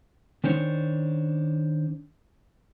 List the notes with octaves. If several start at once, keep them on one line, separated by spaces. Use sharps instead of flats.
D#3 C#4 D4 C5 C#5